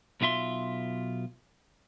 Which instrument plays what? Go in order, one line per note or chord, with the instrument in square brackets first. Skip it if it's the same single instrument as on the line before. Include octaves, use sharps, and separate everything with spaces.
[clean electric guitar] B1 B2 F4 E5 C6